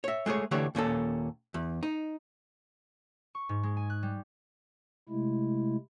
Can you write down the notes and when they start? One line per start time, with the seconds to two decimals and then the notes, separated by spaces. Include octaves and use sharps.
0.04 C#5 E5
0.26 G#3 A3 G#4 C#5
0.51 D3 E3 A3 D4 G4 C#5
0.75 D#2 A#2 C#4 A4
1.54 E2
1.83 D#4
3.35 C#6
3.49 G#2
3.63 G#3
3.77 G#5
3.90 F#6
4.03 G3
5.09 C3 G#3 A3 E4